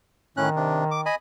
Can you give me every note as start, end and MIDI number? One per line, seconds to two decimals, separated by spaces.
0.37 0.49 45
0.37 1.06 51
0.37 0.49 61
0.37 0.49 90
0.56 0.84 48
0.56 0.84 62
0.91 1.01 86
1.06 1.15 75
1.06 1.15 80
1.06 1.15 83